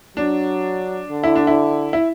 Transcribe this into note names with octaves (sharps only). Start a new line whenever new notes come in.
F#3 D4
D3
E4
D4
E4
E4